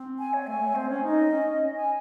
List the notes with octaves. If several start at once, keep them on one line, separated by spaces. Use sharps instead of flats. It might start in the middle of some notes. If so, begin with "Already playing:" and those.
Already playing: C4
G#5
C#5
A3 G#5
A3
C4 C5
C#4 C#5
D#4 D#5
C#4
G#5